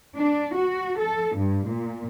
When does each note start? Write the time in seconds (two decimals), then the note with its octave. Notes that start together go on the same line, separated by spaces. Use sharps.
0.15 D4
0.54 F#4
1.00 A4
1.36 G2
1.67 A#2